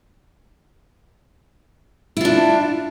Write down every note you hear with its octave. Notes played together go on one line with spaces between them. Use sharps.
D4 E4 F4